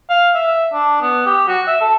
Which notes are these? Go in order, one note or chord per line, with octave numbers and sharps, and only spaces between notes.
F5
E5
D4
B3
G4
F#4
E5
A4